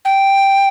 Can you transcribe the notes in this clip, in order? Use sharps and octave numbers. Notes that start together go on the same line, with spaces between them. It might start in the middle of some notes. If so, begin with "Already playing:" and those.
G5